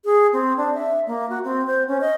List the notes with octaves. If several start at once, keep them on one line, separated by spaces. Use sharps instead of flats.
G#4
C4
D4
E5
A#3
F#4
C4
C5
C#4
D#5